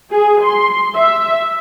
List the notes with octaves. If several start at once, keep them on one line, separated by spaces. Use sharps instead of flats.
G#4
C6
E5